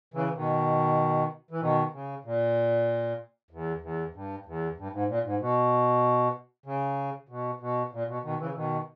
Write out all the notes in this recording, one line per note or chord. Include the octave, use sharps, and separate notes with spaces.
C#3 E3
B2 D#3
E3
B2 D#3
C#3
A#2
E2
E2
G2
E2
G2
G#2
A#2
G#2
B2
C#3
B2
B2
A#2
B2
B2 D#3
C#3 E3
E3
B2 D#3